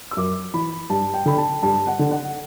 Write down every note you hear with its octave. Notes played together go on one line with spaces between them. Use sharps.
E6
F#2 D6
E3 B5
G2 A5
G5
D3 B5
A5
G2 A5
F#5
D3
F#5